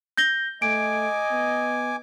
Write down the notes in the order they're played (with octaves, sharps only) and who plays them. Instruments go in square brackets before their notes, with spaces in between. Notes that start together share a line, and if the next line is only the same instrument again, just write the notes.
[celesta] G6 A#6 G7
[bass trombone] A3 [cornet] D#5 [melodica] G#5 D6 [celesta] D7
[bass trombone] B3